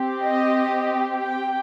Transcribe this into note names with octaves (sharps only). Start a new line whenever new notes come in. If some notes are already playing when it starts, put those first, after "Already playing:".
Already playing: C4 G4
D#5
G5